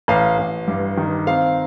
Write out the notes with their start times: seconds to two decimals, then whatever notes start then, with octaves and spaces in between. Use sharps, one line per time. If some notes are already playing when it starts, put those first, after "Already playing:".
0.08 A1 F5
0.38 A1
0.67 G2
0.97 D#3
1.27 C4 F5